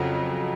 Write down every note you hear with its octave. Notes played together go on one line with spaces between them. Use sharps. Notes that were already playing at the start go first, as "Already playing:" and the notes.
Already playing: F2 C#3 F#3